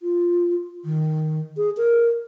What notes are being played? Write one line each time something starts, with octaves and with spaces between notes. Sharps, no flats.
F4
D#3
G#4
A#4